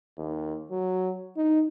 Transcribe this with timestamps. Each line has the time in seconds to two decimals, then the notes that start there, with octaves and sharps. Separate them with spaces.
0.18 D#2
0.71 F#3
1.37 D#4